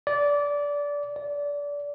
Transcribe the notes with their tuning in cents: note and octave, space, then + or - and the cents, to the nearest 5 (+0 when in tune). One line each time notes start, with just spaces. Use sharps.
D5 -20
D5 -25